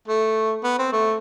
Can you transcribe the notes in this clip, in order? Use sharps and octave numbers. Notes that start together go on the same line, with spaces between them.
A3
B3
C4
A3